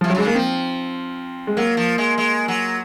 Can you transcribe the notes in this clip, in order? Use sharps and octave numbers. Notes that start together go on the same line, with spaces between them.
C3 F3
F#3
C#3 G#3
D#3 A#3
F3 C4
G#3
F#3 A#3
F3
G#3
G#3
F#3